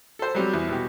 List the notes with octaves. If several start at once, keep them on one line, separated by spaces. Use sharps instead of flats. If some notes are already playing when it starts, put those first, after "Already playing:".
A4 C5
F#3 G3 C4
E2
B2 G4